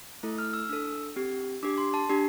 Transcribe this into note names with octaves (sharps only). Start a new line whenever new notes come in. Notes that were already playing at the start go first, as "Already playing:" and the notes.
A3 E4 A4
F6
E6
D4 A4 E6
C4 G4
D4 G4 D6
C6
A5
D4 G4